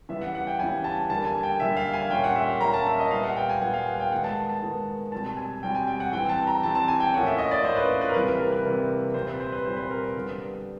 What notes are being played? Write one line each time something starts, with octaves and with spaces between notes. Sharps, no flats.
C#3 E3 G3 B3 E5
F#5
F#5
G5
C#3 E3 G3 B3 G#5
A5
D3 G3 A#3 A5
G#5
G5
D3 G3 A#3 E5
F5
G#5
A#2 G3 A#3 C#4 G5
F#5
E5
F5
A#2 G3 A#3 C#4 A#5
A5
E5
D#5
A#2 G3 B3 F5
F#5
G5
G#5
A#2 G3 B3 F#5
F5
F#5
G5
D#3 G#3 B3 F#5
A5
A5
D#3 G#3 B3
B2 G3 C4 A5
G#5
B2 G3 C4 G5
G#5
G5
F#5
E3 G3 C4 G5
A5
A#5
E3 G3 C4 A5
A5
G#5
G5
A2 F3 A#3 C#4 F#5
E5
D#5
D5
A2 F3 A#3 C#4 C5
B4
B4
A#4
C3 E3 G3 A#3 B4
A#4
B4
C3 E3 G3 A#3
A#2 G3 C4 C5
B4
C5
B4
A#2 G3 C4 C5
B4
A#4
D3 G3 B3